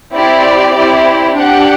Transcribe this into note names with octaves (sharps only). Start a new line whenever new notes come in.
C4 E4 G4 D5
C4 E4 G4
D4 G4 F#5